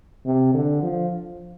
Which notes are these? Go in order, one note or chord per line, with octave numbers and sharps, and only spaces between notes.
C3
D3
F3